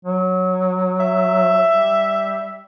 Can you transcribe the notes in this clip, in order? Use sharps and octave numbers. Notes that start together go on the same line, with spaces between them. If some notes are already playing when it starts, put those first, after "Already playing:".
F#3
E5
G3